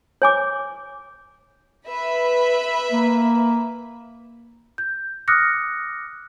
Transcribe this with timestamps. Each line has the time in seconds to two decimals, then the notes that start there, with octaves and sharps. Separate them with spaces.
0.22 C#5 G#5 D6
1.87 B4 E5 B5
2.92 A#3
4.78 G6
5.28 D6 D#6 F6 F#6 A#6 C#7